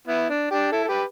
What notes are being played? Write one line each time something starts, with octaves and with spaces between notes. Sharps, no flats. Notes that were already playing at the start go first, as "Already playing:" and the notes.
B3 E4
D4
D4 G4
E4 A4
A4
G4 B4